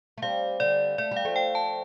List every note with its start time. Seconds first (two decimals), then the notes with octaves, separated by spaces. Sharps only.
0.18 A3
0.22 G3 C4 F5
0.60 D3 G3 D5
0.98 A3 D5
1.11 G3
1.16 F5
1.25 F3 A3
1.36 G5
1.55 A5